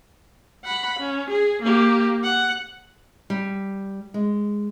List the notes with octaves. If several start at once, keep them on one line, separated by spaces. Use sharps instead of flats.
F#5 B5
C#4
G#4
A#3 G4
F#5
G3
G#3